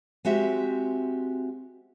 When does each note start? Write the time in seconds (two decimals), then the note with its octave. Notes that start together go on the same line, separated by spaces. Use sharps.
0.25 G#3 C4 F#4 G4 E5